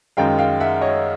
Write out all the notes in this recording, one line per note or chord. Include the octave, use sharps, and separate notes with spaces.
F#2 D#3 G#3 F5 G5
F5 G5
E5 F#5
C#5 D#5